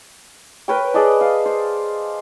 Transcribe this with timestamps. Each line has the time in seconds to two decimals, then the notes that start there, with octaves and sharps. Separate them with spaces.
0.68 A#4 B4 C#5 G5
0.94 G#4 D5 D#5 A5
1.21 F5
1.46 C5